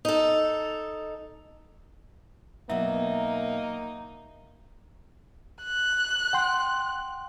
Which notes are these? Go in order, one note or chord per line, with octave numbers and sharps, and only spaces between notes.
D#4 A4
B2 F#3 A#3 D#4 E5
F#6
F#5 G5 C6